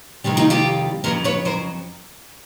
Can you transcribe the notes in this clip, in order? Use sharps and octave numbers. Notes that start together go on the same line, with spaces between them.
F2 C3 D#3 G3
D#4 F4
F4 G4
F2 C#3 F#3 A#4 C5
B4 C#5
A#4 C5